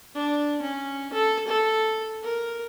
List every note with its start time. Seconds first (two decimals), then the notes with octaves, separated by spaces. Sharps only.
0.15 D4
0.62 C#4
1.13 A4
1.47 A4
2.23 A#4